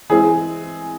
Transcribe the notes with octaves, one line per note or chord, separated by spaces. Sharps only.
E3 G#3 C4 G#4